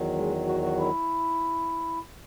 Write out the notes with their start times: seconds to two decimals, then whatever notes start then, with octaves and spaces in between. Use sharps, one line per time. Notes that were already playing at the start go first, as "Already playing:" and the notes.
Already playing: E2 D#3 F#3
0.15 G#3
0.47 F#4
0.62 F#4
0.77 E4